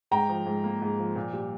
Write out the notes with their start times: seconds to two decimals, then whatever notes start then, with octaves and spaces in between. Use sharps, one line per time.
0.11 G#2 G5 A#5
0.29 F3
0.46 G#2
0.64 A#3
0.82 G#2
0.99 F3
1.16 A#2
1.33 G3